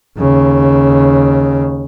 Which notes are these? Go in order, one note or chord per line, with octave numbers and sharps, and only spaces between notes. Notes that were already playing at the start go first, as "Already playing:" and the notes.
D#2 C#3